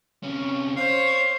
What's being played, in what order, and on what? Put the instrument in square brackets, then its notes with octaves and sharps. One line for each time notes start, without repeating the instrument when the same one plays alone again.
[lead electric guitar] C3 C#4
[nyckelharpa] C5 [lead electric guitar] C#5 [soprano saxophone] F5